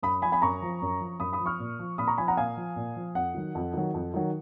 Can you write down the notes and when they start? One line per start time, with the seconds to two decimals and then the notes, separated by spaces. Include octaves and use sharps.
0.02 F#2 B5 D#6
0.22 F3 G#5 B5
0.32 G#5 B5
0.42 F#2 A#5 C#6
0.62 F3
0.82 F#2
1.00 F3
1.20 F#2 B5 D#6
1.33 B5 D#6
1.40 F3
1.46 C#6 F6
1.59 A#2
1.79 F3
1.98 A#2 B5 D#6
2.08 A#5 C#6
2.18 F3 G#5 B5
2.28 F#5 A#5
2.37 A#2 F5 G#5
2.57 F3
2.76 A#2
2.96 F3
3.15 F2 F#5
3.35 D#3 F#3
3.55 F2
3.74 D#3 F#3
3.94 F2
4.14 D#3 F#3